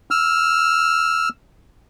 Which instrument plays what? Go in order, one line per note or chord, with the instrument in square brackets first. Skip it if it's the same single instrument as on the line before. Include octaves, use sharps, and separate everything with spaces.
[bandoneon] E6 F6